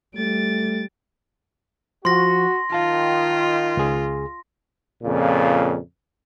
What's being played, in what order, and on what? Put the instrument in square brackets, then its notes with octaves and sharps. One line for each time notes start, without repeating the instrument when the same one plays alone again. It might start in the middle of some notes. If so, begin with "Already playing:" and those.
[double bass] G3 [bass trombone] A3 [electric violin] A6 D7
[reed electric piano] F3 [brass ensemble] F#4 [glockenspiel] C6 A#6
[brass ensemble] D#3 [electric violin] F4 [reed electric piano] F5 A5
[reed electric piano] C#2 G#4
[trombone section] F2 A#2 C#3